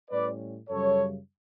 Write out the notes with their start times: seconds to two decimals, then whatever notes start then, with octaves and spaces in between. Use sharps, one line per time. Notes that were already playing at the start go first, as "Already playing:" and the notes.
0.10 A2 G3 C#4 B4 D5
0.69 F#2 C#3 G3 A4 C#5